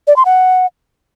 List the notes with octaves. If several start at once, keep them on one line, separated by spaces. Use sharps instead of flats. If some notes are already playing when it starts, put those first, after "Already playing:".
D5
C6
F#5